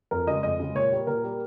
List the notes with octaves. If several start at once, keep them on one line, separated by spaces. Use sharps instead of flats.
F2 A#4
C#3 G#3 D#5
F2 D#5
C#3 G#3
A#2 C#5
G3 A#3
A#2 A#4
G3 A#3